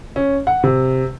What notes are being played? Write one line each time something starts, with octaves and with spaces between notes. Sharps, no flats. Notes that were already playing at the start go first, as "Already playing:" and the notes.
C#4
F#5
C3